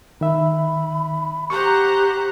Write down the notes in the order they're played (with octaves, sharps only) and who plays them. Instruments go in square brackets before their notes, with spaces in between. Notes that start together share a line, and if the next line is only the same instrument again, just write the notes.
[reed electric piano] D#3 E5 [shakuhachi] B5
[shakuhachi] G4 [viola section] C5 F#5 A#5 [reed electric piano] C#6